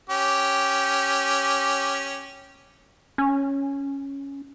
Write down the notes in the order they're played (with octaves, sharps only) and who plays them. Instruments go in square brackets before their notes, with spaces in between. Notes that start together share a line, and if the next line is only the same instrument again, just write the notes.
[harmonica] C#4 G4
[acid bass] C#4